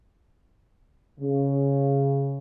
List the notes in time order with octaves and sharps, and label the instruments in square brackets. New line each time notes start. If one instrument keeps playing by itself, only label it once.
[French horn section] C#3